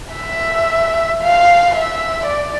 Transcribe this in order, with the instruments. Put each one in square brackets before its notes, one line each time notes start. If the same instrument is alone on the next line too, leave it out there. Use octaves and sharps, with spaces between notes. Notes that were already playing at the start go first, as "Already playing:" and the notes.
[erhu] E5
F5
E5
D5